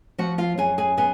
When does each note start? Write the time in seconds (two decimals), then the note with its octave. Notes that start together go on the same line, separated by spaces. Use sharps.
0.18 F3 F#4 F#5
0.38 F4 F5
0.58 F#2 G#4 G#5
0.78 G#4 G#5
0.97 B3 G#4 G#5